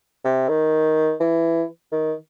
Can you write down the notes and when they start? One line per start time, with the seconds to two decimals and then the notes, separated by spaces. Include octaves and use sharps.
0.25 C3
0.49 D#3
1.20 E3
1.92 D#3